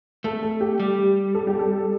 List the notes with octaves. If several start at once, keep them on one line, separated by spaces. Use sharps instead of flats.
A3 A4
A4
G4
G3
A4
G4
A4